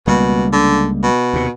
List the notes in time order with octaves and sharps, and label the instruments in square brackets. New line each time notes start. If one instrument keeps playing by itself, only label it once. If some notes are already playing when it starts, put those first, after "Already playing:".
[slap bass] C#2 G3 A#3 [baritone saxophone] B2
[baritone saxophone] D3
B2
[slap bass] D#2 C3